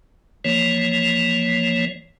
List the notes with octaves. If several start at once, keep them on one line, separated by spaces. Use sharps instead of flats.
E3 F3 A#3 C#5